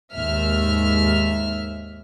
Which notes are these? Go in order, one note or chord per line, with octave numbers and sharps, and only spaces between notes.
D#2 G#2 E5 F6